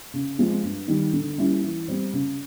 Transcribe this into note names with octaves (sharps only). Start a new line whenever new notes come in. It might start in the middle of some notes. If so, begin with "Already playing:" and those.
C#3
F3 G#3 C4
G2
D#3 G3
D3
G3 A#3 C#4 E4
E3
G3 C4
C#3